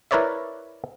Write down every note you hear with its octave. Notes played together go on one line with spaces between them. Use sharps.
E4 A#4 B4 C#5 D5 E5